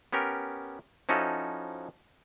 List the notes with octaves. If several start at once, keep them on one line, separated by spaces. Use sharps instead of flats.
B3 C#4 G4 A#4
F3 C#4 D#4 E4 F#4 A4